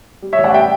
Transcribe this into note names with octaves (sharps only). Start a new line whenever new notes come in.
G3
C#5 E5
A1
D5 F#5
G3 E5 G5